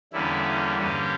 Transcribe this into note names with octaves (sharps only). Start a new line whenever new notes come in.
E2 D3 G3 A#3 C#4 E4
G2 D3 A#3 C#4 G4